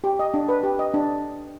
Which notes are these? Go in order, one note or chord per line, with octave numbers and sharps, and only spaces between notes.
G4
D#5
D4
B4
G4
D#5
D4